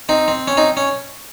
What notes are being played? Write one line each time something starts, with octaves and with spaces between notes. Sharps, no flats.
C4 D#4
C4
C#4
C4 D#4
C#4